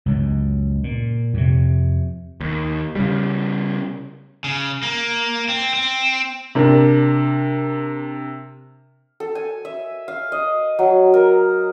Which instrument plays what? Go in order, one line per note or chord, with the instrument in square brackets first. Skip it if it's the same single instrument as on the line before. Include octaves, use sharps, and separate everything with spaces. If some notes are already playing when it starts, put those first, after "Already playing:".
[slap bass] C#2 F#2
A#2
F2 C3
[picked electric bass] D#2
C#3 G3
[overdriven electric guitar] C#3
A#3
C4
C4
[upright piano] C3 D4 A#4
[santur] A4
G#5
E5
F5
D#5
F#3
A#4